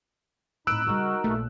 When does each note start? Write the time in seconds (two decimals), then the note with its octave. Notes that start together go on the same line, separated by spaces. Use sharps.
0.67 A2 C4 D#4 B5 E6 F#6 D7
0.87 C#3 G3 D#4 F#4 A#4
1.24 A#1 A3